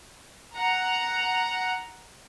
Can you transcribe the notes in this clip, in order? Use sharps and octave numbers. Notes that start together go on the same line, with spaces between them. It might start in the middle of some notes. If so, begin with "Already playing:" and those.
F#5 A#5